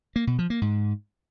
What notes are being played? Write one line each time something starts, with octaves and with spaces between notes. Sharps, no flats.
A#3
B2
F3
A#3
G#2